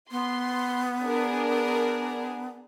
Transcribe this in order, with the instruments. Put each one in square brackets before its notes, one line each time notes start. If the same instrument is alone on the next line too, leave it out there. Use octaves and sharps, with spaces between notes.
[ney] B3 [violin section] C6
[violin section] D4 G#4 A#4